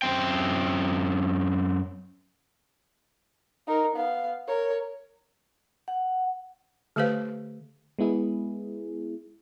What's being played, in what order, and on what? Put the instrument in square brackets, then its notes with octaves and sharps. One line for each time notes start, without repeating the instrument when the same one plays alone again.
[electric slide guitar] F#2 C4 G5
[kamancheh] D#4 A#4
B3 F5
A#4 C#5
[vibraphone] F#5
[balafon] D3 A3 G4 B4 C5 F5
[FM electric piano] G#3 B3 E4 G#4